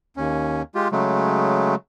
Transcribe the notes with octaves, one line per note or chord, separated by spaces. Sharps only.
D#2 C#4
G#3 F4 G4
C#3 F#3 G#3 A3